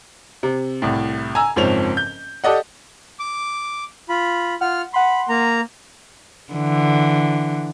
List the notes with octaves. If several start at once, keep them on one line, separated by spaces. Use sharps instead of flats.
C3
C2 A2
G#5 A#5 E6
F#1 G#2 F3 C4 C#5 F7
G6
G4 A4 D5 D#5 F#5
D6
F4 B5
F4 F#5 F6
F#5 B5 C6
A#3 A#5
D3 E3